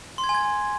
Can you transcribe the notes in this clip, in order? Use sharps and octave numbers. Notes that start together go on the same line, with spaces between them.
C6
G#6
G#5
G#6